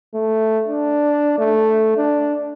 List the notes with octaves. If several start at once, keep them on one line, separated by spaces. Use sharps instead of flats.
A3
D4
A3
D4